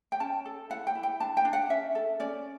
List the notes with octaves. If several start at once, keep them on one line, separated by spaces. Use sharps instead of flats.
G5
C#4 A5
A4
E4 F#5
G5
E4
G5
D4 A5
G5
D4
F#5
C#4 E5
A4
C#4 D5